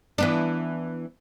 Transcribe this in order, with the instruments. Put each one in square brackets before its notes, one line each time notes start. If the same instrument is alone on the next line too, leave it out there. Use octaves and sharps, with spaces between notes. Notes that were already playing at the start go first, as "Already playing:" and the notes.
[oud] E3 B3 D4